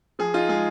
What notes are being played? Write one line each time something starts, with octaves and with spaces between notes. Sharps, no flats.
F3 G#4
D#4 F4
G#3 G#4